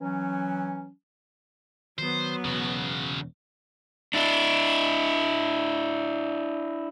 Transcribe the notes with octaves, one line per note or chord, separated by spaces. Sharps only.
E3 F#3 C#4
D#3 F#3 B3 C5
E1 C#3 F#4
D4 E4